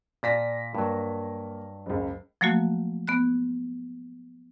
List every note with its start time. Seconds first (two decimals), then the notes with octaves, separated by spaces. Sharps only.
0.23 A#2 F4 D5 A5 A#6 B6
0.75 G2 F#3 A#3
1.86 F#1 C#2
2.41 F3 F#3 A3 A#3 F#4
3.08 B3 B5 F#6